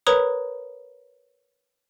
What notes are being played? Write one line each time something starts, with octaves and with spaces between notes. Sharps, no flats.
A#4 B4 C#5 A#5 B5 D#6